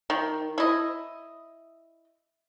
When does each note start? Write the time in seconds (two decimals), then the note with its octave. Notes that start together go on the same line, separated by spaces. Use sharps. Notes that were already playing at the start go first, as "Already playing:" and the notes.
0.10 D#3
0.58 E4 D#5